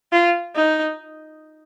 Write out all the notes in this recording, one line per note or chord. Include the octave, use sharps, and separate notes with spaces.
F4
D#4